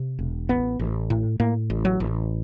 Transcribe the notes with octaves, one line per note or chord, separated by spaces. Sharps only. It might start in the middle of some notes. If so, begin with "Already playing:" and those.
Already playing: C3
E1
A1 B3
A1
A2
A2 A#3
A1
F#3
A1